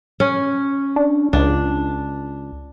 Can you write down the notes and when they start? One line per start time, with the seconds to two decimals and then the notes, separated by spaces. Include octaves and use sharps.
0.20 C#4
0.96 D4
1.33 C#2 D4